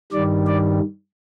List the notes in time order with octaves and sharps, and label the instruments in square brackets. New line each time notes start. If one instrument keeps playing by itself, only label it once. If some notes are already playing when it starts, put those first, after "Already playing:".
[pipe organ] G2 D#3 G3 D5
D5